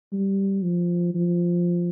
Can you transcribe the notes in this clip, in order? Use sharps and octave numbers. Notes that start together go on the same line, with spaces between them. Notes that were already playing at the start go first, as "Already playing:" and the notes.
G3
F3
F3